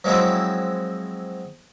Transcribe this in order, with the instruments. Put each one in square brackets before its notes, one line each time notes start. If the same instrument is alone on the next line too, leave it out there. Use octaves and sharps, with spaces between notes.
[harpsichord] F3 F#3 G#3 C4 E4